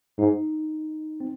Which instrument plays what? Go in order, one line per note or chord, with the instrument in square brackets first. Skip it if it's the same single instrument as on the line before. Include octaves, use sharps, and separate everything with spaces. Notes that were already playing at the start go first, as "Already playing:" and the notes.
[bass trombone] G#2 [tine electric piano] D#4
[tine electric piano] C4